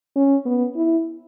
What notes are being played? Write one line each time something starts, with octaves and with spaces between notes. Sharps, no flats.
C#4
B3
E4